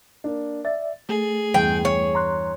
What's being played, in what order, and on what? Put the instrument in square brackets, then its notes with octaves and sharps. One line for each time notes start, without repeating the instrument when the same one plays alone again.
[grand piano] A#3 D4
[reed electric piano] D5 E5 [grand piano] A6
[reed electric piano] A3 [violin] G#4
[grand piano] E2 G2 [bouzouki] G5
[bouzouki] C#5
[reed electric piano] A#5 C6 F#6